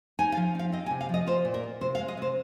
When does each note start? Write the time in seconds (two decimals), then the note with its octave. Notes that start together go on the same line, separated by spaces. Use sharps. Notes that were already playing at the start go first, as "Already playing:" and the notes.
0.19 D#4 G#5
0.32 F5
0.37 F3
0.55 C4 F5
0.72 C4 D#5
0.86 G#5
0.91 C3
1.01 F5
1.09 F3 D#5
1.27 F4 C5
1.45 A#2
1.54 A#4
1.63 F4
1.81 C3 C5
1.95 F5
1.99 G#3
2.08 D#5
2.17 C3 C5